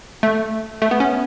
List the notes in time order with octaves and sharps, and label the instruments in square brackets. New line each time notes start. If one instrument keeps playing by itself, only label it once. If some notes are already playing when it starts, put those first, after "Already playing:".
[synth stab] A3
A3
B3
C#4